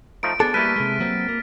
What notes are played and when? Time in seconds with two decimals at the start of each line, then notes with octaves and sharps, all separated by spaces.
0.23 F3 A3 D#4 D7
0.40 B3 D4 G#4 A4 A6
0.54 G3 A3 A#3 E4 B4 F6 B6 D#7
0.76 C3 G#3
1.00 F#3 A#3 C4
1.29 A#3